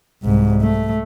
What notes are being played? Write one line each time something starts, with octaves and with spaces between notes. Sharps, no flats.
C2 G#2
A3